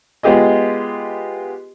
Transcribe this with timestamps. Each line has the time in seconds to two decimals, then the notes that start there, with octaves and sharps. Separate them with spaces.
0.23 G#3 B3 F4 G4 G#4 D#5